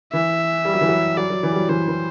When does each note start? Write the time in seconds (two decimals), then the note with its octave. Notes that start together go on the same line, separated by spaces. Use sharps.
0.13 E3 E5
0.65 G3
0.74 F#3
0.81 E3
0.89 F#3
1.17 F#3 D5
1.30 F#3
1.43 E3
1.52 G3
1.56 F#3
1.69 E3 C5
1.88 E3